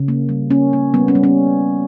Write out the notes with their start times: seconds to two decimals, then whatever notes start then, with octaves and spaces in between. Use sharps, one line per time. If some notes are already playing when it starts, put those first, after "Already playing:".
Already playing: C#3
0.08 A#3
0.29 G3
0.51 A#3 C#4
0.73 A#3
0.94 G3 B3
1.08 C#4
1.15 G3
1.23 C#4